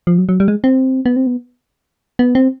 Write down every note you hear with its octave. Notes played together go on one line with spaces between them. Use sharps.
F3
F#3
F#3
G3
G#3
C4
B3
C4
B3
B3
C4